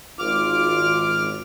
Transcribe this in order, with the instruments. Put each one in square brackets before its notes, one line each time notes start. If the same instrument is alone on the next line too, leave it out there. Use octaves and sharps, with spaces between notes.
[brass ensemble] G#1 F4 [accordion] D6 F6